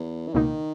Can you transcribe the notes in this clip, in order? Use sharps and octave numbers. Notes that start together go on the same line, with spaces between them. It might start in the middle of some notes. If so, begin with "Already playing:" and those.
Already playing: E2
E3
C#2 B2 D#3 A#3 D#4